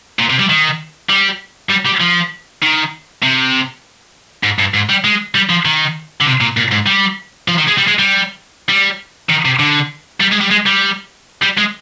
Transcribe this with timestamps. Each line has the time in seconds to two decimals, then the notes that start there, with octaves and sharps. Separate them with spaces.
0.19 A#2
0.30 C3
0.40 G3
0.50 D#3
1.10 G3
1.70 G3
1.86 G3
2.01 F3
2.63 D#3
3.23 C3
4.44 G#2
4.59 G2
4.74 G#2
4.90 G3
5.04 G#3
5.35 G3
5.50 F3
5.65 D#3
6.21 D3
6.26 C3
6.41 A#2
6.57 A#2
6.71 G#2
6.86 G3
7.48 F3
7.58 D#3
7.68 G#3
7.78 G3
7.88 G#3
7.99 G3
8.69 G3
9.29 D#3
9.45 C3
9.59 D3
10.20 G3
10.31 G#3
10.41 G3
10.50 G#3
10.66 G3
11.42 G3
11.58 G#3